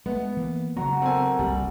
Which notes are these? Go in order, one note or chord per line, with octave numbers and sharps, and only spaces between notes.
G#3 A3 B3
E3 A#3
C#3 F#3 B3 F#4 A#5
C4 A4 A#4 G#5
F#1 C2 C3 G3